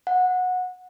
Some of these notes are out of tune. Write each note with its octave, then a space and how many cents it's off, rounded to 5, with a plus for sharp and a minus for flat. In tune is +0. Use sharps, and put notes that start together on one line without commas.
F#5 -20